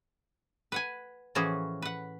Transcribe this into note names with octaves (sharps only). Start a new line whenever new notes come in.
B4 F#5 G#5
A2 E3 F3 C#4 F#4 G#4
B4 F#5